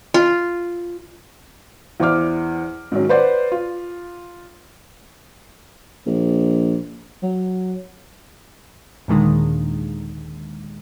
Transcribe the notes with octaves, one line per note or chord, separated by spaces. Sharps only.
F4
E2 E4 C5 D5 D6 F6
G#2 D#3 F#3 C#4
B4 C5 D5 F#5
F4
A#1
F#3
D#2 A#2 D3 D#3 G#3